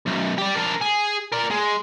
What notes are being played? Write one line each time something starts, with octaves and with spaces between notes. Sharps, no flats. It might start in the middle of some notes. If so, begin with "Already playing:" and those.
B1 F#2
G4 D5
D4 A#4
G#4
A#4 D5
G#3